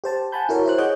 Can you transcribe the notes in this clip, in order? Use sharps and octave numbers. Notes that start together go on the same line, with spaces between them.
G4 C5 A5
F#5 G#5 A5 B5 G6
E4 F#4 A#4 C#5
E4 C5 F#6
G#4 C#5 D#5 F#5 D6 G6